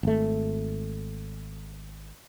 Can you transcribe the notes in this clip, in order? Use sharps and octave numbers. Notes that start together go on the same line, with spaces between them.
G#1 A3